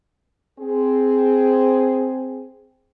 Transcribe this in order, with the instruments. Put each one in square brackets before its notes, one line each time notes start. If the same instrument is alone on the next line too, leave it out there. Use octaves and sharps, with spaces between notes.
[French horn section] C4 G#4